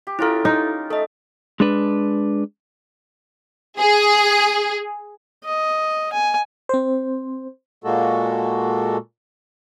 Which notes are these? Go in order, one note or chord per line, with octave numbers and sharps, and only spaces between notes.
G4
C#4 E4 F4 A4 A#4
D#4
A3 A4 D#5
G#3 D4 B4
G#4
D#5
G#5
C4 C5
A#2 G#3 A#3 F#4 A4